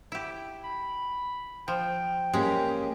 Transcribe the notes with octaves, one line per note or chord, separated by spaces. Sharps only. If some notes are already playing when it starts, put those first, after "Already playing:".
E4 G4
B5
F3 G5
G#3 A#3 C#4 G4